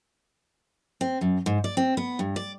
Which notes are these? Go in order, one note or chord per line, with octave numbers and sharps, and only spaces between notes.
C4
F#2
G#2
D5
C4
B3
G2
D5